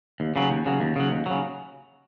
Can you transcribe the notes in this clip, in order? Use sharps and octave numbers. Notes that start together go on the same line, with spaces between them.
D#2
C#3 F#3
D#2
C#3 F#3
D#2
C#3 F#3
D#2
C#3 F#3